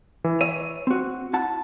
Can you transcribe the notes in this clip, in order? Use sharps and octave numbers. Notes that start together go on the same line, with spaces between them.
E3
C#5 E5 D#7
C4 F#4
E4 F#5 A5